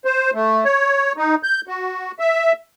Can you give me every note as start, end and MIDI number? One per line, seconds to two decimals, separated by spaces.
0.05 0.31 72
0.34 0.64 57
0.65 1.13 73
1.17 1.35 63
1.43 1.61 91
1.67 2.12 66
2.19 2.52 76